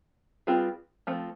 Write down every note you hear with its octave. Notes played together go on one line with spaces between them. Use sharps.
G3 C4 F4 G#4 B4
F3 A3 C4